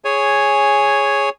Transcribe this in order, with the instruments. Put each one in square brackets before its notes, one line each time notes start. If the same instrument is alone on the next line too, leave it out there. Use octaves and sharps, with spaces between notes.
[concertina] G#4 C#5 G#5